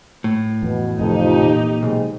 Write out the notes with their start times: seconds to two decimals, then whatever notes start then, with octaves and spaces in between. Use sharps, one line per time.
0.24 A2
0.62 F2 B2 E3 A3
0.99 F1 F2 C3 E3 D#4 G4
1.42 A#2 E3 A#3
1.83 B1 G#3 C4